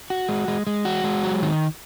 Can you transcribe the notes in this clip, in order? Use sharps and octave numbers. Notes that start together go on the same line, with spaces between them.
F#4
G#3
G#3
G#3
F#4
G#3
F#3
D#3